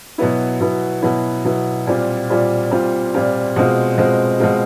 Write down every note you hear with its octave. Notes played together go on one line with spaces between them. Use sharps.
B2 F#3 B3 E4
B2 F#3 B3 E4
B2 F#3 B3 E4
B2 F#3 B3 E4
A#2 G3 C4 F4
A#2 G3 C4 F4
A#2 G3 C4 F4
A#2 G3 C4 F4
B2 G#3 C4 F4
B2 G#3 C4 F4
B2 G#3 C4 F4